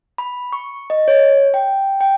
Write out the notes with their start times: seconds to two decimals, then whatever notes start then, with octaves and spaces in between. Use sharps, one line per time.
0.18 B5
0.53 C#6
0.90 D#5
1.08 C#5
1.54 G5
2.01 G5